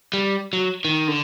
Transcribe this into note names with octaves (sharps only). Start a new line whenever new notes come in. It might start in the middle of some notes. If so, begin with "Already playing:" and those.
G3
F#3
D#3
D3